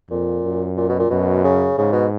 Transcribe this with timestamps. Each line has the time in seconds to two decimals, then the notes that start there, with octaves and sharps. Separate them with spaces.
0.10 F2 A#2
0.43 F#2
0.77 A#2
0.89 B2
0.99 A#2
1.10 F#2 B2
1.44 C#3
1.78 G#2 C#3
1.92 B2